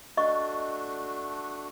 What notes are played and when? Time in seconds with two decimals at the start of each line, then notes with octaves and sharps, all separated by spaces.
0.17 A3 D4 F#4 D#5 C#6